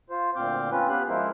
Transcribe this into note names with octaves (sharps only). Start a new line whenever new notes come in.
F4 C5
D2 A#2 C4 F5 D6 G6
C4 C#4 F4 B4
B3 G4 B4 F5 F#6
F3 G#3 E4 A#4 C5